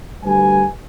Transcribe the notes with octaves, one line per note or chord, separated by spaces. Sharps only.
D2 G3 B4 G#5